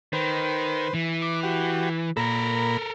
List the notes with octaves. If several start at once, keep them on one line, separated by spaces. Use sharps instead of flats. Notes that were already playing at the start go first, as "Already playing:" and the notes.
D#3 B4 C5
E3
D6
F#4 G4
A#2 A4 A#4 A#5 B5